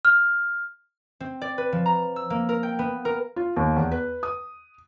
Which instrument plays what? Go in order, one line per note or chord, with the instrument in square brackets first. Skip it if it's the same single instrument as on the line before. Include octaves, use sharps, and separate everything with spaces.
[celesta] F6
[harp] C4
D5
B4
F3
A#5
E6
A#3
A#4
G5
B3
A#4
[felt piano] F4
D#2
E2
B4
D#6